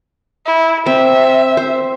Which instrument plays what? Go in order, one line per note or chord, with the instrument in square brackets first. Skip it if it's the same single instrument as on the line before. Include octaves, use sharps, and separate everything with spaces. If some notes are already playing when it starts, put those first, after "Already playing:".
[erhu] E4
[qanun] C4 [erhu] E5
[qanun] C5